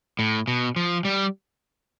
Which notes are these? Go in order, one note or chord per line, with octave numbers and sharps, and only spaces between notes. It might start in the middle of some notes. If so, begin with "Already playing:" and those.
A2
B2
F3
G3